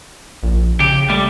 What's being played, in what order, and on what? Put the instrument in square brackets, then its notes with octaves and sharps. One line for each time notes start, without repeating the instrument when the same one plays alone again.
[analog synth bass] A#1
[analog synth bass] C#3 [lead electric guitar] G4
[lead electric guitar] G3 [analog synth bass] A3